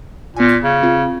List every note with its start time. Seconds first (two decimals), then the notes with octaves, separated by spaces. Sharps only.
0.37 A#2 B3 G#5
0.49 G#6
0.64 C#3
0.83 C4 F4